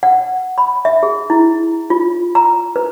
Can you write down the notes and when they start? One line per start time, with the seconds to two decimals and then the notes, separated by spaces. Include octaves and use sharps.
0.03 F#5
0.58 B5
0.85 E5
1.03 G#4
1.30 E4
1.90 F4
2.35 A#5
2.76 B4